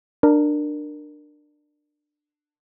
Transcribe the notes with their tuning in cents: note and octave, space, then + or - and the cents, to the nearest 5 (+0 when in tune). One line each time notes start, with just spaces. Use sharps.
D4 +20 A#4 +0